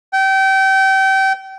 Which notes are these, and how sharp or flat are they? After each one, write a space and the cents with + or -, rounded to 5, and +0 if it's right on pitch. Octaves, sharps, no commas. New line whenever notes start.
G5 -30